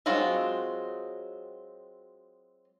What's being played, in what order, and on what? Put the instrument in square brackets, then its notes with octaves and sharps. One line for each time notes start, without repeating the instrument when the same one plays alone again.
[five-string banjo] F#3 G#3 C4 F4 F#4